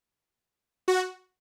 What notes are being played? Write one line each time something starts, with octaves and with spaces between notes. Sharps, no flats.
F#4